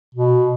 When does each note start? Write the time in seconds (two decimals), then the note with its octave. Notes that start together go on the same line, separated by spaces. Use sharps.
0.15 B2